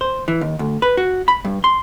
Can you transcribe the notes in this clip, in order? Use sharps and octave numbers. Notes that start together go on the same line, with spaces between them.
C5
E3
D#2
D2
B4
F#4
B5
G2
C6